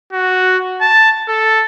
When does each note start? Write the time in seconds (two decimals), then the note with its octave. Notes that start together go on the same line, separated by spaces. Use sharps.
0.13 F#4
0.81 A5
1.28 A4